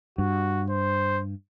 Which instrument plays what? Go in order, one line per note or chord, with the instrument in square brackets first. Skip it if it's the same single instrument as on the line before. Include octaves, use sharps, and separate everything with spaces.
[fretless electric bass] G2 [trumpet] F#4
[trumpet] C5